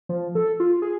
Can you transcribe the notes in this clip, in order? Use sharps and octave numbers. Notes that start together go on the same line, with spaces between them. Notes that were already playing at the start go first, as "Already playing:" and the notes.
F3
A4
F4
G#4